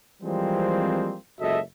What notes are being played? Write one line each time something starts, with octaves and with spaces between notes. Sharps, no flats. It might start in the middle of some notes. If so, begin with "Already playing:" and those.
E3 F3 G3 G#3 A#3 C4
F#1 C#2 F#4 A4 D#5 E5